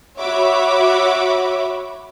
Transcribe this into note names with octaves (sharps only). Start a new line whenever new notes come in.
F#4 C#5 E5 B5 D6